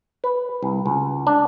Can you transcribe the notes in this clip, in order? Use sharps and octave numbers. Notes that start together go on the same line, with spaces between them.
B4
C2
C#2
D4